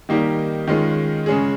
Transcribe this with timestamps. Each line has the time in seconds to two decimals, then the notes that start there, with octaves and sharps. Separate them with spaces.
0.09 D#3 G3 A#3 D#4 G4
0.67 D#3 G#3 C#4 F4
1.26 C#3 G#3 C#4 G#4